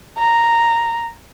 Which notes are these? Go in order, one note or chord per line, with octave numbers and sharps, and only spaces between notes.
A#5